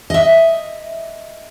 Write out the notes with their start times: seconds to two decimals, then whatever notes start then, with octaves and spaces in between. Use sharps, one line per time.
0.10 D#5 E5